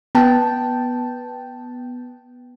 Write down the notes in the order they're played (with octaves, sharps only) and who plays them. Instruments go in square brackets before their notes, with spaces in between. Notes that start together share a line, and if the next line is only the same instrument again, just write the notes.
[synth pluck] B3 G5 A5